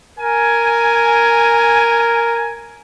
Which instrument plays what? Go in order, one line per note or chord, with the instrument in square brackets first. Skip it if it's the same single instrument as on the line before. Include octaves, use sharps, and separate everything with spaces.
[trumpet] A#4 [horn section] G#5